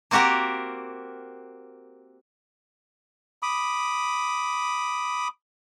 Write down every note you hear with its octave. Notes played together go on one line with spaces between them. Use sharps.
A#3 C4 F#4 G4 A#4
B5 D6 D#6